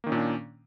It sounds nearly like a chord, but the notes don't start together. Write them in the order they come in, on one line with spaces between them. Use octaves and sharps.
A#3 D#3 C#4 A#2 D4